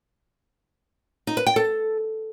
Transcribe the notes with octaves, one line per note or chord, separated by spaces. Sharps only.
D#4
B4
G5
A4